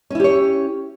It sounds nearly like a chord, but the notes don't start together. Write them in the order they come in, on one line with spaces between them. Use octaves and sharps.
C#4 E4 G4 C#5